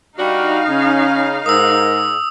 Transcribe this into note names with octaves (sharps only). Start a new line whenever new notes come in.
G3 D4 D#4 F#4 F5
C#3 C#4
G#2 A#4 D#6 E6